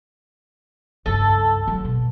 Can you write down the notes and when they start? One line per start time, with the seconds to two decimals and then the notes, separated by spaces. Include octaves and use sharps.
1.06 C#2 G2 A4
1.68 F#3
1.85 B2